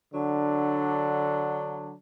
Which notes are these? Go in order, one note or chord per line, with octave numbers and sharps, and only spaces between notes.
D3 F#3 D4